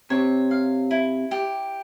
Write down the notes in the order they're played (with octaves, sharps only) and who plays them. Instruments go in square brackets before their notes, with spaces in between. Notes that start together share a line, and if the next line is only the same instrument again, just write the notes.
[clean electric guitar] C3 [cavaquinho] C#5
[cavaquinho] F5
E4
G4